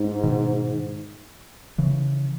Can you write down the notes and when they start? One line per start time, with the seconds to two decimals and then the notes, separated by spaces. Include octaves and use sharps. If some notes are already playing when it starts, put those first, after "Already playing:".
Already playing: G#2
0.23 B2 D#3
1.78 C#3 E3